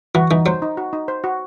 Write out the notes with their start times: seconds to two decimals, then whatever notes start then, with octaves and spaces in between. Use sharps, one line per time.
0.15 E3 F#4
0.31 E3 D#4
0.46 F#3 C5
0.62 D#4
0.77 F#4
0.93 D#4
1.08 C5
1.24 F#4